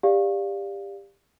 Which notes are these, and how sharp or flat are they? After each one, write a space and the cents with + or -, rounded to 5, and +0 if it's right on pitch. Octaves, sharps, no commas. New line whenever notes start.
G4 +25 D5 +0 F5 +0